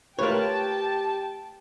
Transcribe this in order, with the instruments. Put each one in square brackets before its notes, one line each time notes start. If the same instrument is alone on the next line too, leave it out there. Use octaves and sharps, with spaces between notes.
[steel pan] A3 F4 B4 [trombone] G4 [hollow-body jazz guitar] A#4 C#5 [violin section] G5 A5